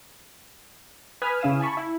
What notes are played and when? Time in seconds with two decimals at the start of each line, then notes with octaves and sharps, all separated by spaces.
1.22 B4 G#5 D#6 F6 B6
1.41 C#3 C#4 E4 F5 D#6 E7
1.60 G#5 A5 B5 C#6
1.77 E4